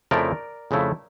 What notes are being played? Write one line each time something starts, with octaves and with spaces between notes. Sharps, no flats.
F2 C#3 F3 A3 E4 A#4 D5
F2 C#3 F3 A3 E4